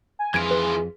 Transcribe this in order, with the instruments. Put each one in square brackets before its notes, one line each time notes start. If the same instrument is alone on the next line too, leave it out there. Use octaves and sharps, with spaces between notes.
[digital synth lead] G#5
[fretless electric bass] F2 [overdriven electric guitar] E3 F4 [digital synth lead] G#4 [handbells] G#6 D7
[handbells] B4